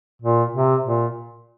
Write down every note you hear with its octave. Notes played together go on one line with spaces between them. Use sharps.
A#2
C3
A#2